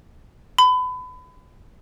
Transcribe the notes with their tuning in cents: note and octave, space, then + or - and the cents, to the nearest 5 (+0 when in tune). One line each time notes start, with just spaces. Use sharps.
B5 +30